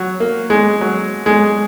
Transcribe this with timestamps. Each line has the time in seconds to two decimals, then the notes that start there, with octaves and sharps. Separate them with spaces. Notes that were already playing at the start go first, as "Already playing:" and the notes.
Already playing: F#3
0.20 A#3
0.50 G#3
0.81 F#3
1.26 G#3